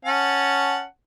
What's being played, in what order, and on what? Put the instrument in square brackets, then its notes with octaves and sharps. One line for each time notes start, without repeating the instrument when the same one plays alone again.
[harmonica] C#4 F#5 A5